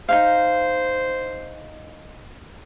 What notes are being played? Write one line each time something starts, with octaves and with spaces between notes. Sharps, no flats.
D#4 E4 C5 F5